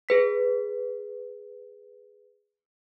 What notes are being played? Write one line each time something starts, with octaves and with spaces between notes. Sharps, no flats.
G#4 B4 B6